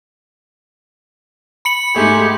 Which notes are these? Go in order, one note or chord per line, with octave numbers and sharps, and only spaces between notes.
B5 C#7 F#7
G#2 A3 G4 G#4